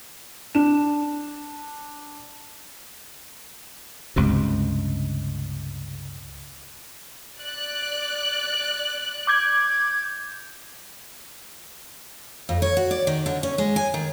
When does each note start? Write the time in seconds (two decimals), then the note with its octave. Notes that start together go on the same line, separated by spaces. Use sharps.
0.55 D4 E7
4.16 C#2 G2 C3
7.39 D5 F#6
9.27 D6 G6 G#6
12.49 F2
12.62 C#5
12.77 F#4
12.91 D5
13.07 D#3
13.26 D3
13.43 C#4
13.58 G#3
13.76 G#5
13.94 D#3